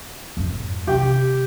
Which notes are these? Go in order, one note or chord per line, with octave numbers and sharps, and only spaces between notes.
F2 G#2
C3 D#3 G4